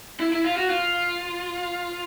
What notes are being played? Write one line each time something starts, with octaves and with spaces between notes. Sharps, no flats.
E4
E4
F4
F#4
F4